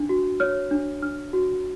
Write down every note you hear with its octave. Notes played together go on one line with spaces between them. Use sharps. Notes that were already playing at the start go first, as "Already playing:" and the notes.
Already playing: D4
F#4
C#5 F6
D4
D4 F6
F#4